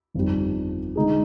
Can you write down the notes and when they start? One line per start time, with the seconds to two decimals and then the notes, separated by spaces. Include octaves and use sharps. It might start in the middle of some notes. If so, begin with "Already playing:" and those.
0.14 G1 F2 D#3 G3
0.95 D3 G#3 D#4 G#4